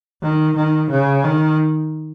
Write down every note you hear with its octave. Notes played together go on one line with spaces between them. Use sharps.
D#3
D#3
C#3
D#3